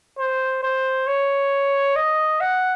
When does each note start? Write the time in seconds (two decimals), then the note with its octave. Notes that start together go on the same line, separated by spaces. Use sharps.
0.18 C5
0.63 C5
1.07 C#5
1.96 D#5
2.41 F#5